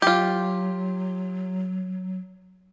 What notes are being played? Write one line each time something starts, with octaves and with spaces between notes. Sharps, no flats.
F#3 F4 G4